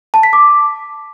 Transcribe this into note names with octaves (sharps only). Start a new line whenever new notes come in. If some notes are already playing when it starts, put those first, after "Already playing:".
A5
B6
D6